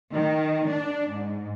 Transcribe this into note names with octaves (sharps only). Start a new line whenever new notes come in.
D#3
D4
G#2